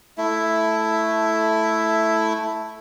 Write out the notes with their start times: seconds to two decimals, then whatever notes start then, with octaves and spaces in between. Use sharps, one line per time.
0.18 A3 E4